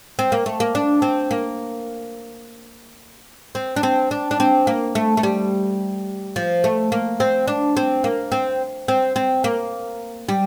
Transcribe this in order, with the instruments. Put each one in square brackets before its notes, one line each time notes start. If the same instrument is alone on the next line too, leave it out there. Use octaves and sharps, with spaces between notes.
[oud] C4
A#3
A3
A#3
D4
C4
A#3
C4
D4
C4
D4
D4
C4
A#3
A3
A3
G3
F3
A3
A#3
C4
D4
C4
A#3
C4
C4
C4
A#3
G3